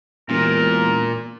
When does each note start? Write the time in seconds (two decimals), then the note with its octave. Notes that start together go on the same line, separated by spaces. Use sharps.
0.29 E1 A#2 A#4